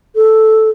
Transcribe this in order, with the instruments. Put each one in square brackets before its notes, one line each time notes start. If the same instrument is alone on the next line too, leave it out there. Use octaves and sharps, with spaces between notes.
[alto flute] A4